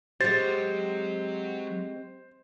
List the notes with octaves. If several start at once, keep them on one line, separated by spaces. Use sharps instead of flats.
F#3 G#3 C4 G4 C5 C#5 A6